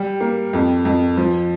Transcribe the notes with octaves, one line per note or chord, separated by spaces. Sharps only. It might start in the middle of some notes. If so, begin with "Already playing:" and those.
Already playing: G3
A#3
F2
F2
F3